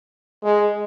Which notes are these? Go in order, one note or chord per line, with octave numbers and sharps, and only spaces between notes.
G#3